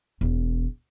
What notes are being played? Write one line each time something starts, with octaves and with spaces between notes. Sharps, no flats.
E1 E2